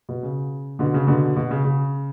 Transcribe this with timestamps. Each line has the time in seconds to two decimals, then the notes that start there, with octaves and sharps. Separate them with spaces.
0.09 B2
0.23 C#3
0.79 B2 D3
0.94 C#3
1.07 B2 D3
1.36 B2
1.51 C#3
1.65 C#3